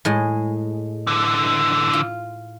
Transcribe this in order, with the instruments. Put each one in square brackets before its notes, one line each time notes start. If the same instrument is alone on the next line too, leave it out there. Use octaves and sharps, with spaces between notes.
[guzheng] A2 G#3
[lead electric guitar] D3 E3
[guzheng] F4